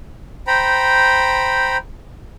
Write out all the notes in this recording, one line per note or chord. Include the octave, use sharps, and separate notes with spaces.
C5 G5 A#5 B5